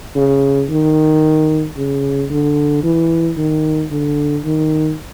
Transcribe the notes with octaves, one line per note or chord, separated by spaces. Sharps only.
C#3
D#3
C#3
D3
E3
D#3
D3
D#3